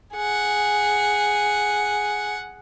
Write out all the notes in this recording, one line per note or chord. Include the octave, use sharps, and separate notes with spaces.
G#4 F#5